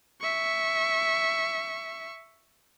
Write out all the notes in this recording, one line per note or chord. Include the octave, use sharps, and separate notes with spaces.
E5 C#6